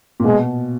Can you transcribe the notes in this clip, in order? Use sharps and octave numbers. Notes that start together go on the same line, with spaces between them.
A#2
B2 G#3